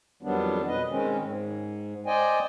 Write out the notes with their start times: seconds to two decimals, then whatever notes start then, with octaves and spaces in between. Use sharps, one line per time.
0.23 F2 D#3 F#3 G3 B3 D4
0.67 B2 B4 D#5
0.89 D#3 G#3 C4 C#4
1.19 G#2
2.06 C5 D5 D#5 G5 G#5